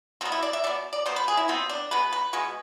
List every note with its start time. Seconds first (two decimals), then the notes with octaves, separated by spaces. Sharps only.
0.21 B2 B3 C4
0.32 E4
0.43 D5
0.53 E5
0.64 B2 B3 D5
0.93 D5
1.06 B2 B3 C5
1.16 B4
1.28 G#4
1.37 E4
1.48 B2 B3 C4
1.69 D4
1.91 B2 G#3 B3 B4
2.13 B4
2.33 B2 G#3 B3